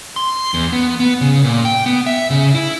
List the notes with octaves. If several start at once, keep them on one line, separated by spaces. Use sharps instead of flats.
C6
E2
B3
B3
C#3
A#2
G5
B3
E5
C#3
E4